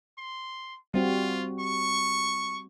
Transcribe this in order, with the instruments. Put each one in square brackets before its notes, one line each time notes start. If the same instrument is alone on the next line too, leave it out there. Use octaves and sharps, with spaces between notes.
[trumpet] C6
[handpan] G3 C4 F#4 [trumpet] F4
[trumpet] C#6